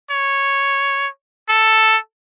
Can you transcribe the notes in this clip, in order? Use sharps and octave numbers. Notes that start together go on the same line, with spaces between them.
C#5
A4